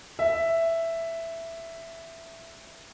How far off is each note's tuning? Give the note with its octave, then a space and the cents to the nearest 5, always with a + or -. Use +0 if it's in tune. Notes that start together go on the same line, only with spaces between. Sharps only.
E5 +5